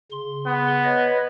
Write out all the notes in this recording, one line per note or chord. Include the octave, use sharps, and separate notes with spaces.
C#3 C6
B3
B4 C#5 D#5